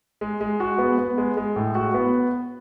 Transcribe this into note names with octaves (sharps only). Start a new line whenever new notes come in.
G#3
G#3
F#4
B3
B3
G#3
G#3
A2
F#4
B3